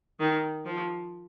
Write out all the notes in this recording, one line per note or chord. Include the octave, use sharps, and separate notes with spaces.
D#3
F3